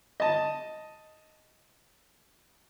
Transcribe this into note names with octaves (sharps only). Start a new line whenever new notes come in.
D#5 A5